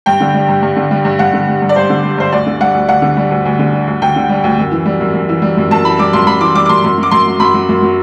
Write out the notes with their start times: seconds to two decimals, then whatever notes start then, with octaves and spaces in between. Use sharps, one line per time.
0.06 G2 G5
0.20 D3
0.34 G3
0.49 G2
0.63 G2
0.76 D3
0.91 G3
1.05 G2
1.19 G2 F#5
1.33 D3
1.48 G3
1.62 G2
1.69 D5
1.76 G2 C5
1.90 D3
2.04 G3
2.18 G2 C5
2.32 D2 D5
2.46 D3
2.61 G3 F#5
2.74 D2
2.88 D2 F#5
3.02 D3
3.17 G3
3.31 D2
3.45 D2
3.59 D3
3.73 G3
3.87 D2
4.02 D2 G5
4.16 D3
4.29 G3
4.44 D2
4.58 F#2
4.71 E3
4.85 G3
5.00 F#2
5.14 F#2
5.29 E3
5.42 G3
5.57 F#2
5.71 F#2 A5
5.85 E3 B5
5.99 G3 D6
6.13 F#2 C6
6.27 F#2 B5
6.41 E3 D6
6.55 G3 D6
6.66 D6
6.69 F#2 C6
6.84 F#2 C6
6.98 F#3 D6
7.11 F#2 C6
7.25 F#3
7.40 F#2 B5
7.54 F#3
7.69 F#2
7.82 F#3